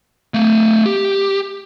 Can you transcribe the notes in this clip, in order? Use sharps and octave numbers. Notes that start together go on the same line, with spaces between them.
A3 F5
G4